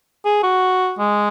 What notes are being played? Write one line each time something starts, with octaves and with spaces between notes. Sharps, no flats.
G#4
F#4
G#3